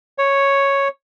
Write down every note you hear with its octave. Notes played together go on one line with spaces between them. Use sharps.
C#5